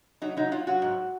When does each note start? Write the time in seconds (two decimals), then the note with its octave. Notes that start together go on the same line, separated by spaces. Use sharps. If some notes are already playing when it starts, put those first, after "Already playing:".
0.22 F#3 D#4
0.37 F#3 D#4
0.52 F#3 F4
0.67 F#3 F#4
0.82 G#2